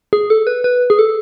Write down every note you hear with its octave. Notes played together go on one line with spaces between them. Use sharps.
G#4
A4
B4
B4
G#4
A4